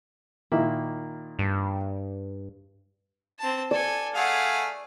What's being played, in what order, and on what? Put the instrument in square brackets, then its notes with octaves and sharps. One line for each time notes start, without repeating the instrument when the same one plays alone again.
[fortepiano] A#2 D#3 A#3 [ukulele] E4
[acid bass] G2
[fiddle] C4 A5
[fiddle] A4 G#5 [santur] D5
[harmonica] A3 F5 G#5 [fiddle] G#4 F#5